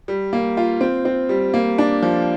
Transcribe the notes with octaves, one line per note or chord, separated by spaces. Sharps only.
G3
A#3
F4
C4
C4
G3
A#3
D4
F3